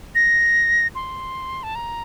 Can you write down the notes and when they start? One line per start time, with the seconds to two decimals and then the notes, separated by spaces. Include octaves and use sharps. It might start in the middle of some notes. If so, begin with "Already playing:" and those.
0.15 A#6
0.95 C6
1.63 A5
1.75 A#5